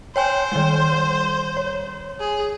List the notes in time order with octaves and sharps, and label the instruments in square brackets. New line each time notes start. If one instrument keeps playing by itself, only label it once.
[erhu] C5 [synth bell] C#5 G5 G#5
[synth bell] D#3 G3
C#5
[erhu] G#4